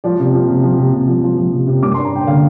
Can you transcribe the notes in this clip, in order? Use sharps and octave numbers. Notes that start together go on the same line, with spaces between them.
F3 D5
C3
F3
C3
F3
C3
C3
F3
F3
F3
C3
C3
G2 D6
D4 C6
A#5
D4 G5
D3 F5